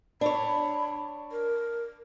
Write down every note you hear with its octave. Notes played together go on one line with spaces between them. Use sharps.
D4 C#5 B5
A#4